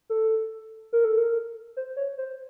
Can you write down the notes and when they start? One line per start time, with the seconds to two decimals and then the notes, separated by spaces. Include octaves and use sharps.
0.10 A4
0.93 A#4
1.05 A4
1.18 A#4
1.77 C5
1.96 C#5
2.18 C5